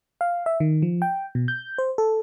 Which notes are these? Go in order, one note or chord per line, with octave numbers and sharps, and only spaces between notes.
F5
E5
D#3
F3
G5
B2
G6
C5
A4